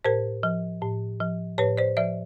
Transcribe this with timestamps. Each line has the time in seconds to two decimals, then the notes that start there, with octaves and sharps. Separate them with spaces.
0.05 A2 A#4 C5
0.43 F3
0.82 A2
1.20 F3
1.58 A2 B4 C#5
1.77 C5 D5
1.97 F3 D5 E5